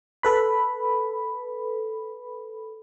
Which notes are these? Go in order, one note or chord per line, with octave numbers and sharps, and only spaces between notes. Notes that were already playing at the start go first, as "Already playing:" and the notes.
A4 B4 B5